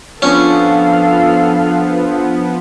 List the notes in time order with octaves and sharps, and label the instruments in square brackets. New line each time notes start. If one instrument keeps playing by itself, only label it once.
[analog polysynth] F3 B3 [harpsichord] C#4 [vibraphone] D4 [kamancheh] A4 F5